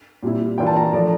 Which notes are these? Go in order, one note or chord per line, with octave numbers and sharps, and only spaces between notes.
A#2 G3 C4 E4
E3 A#3 D4 F4 G5
A5
A#5
F3 A3 D4 D5